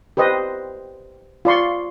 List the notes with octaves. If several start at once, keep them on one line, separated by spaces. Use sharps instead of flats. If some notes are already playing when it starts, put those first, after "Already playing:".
G4 B4 C5 D#5
F4 D5 C6 C#6